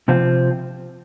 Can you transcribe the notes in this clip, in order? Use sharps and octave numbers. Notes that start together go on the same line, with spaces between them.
C3 F3 C4 F4